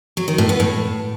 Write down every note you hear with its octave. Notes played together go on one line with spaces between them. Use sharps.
F#3
D#3
A2
B3
A2